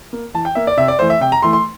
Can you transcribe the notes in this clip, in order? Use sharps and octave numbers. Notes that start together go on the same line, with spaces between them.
A#3
E3 A5
G5
A#3 E5
D5
C3 E5
D5
E3 A3 C5
E5
C3 G5
A#5
E3 A3 C6
C6